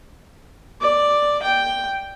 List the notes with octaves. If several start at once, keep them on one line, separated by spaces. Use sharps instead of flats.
D5
G5